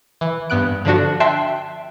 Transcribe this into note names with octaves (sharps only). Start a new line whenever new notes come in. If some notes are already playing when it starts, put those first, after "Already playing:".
E3
G2 B3 F#6 D7
D3 F3 D4 F#4
E5 G5 A5 C6 E6 F#6